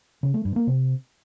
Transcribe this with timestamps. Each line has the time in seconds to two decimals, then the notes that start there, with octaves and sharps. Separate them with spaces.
0.23 C#3
0.34 A3
0.45 G2
0.56 A#3
0.67 C3